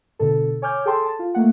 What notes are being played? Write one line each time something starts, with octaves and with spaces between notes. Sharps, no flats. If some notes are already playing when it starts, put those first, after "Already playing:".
B2 D3 A4
C#5 G#5 D6 F6 G6
G#4 A4 G5 A5 C6
A5
F4
A3 A#3 F#5